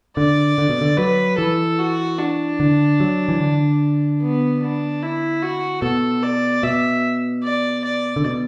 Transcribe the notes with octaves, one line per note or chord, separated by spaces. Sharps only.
D3 D5
D3
B2
D3
F#3 B4
E3 A4
F#4
D4
D3
F#3
E3
D3
B3
D4
E4
F#4
B2 A4
D5
B2 E5
D5
D5
D3
B2